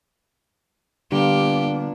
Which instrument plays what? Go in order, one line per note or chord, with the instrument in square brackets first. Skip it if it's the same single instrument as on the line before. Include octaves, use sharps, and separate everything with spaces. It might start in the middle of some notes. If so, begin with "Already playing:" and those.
[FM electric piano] D3 G3 [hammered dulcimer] A#3 F4 [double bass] B3 D4 [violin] G4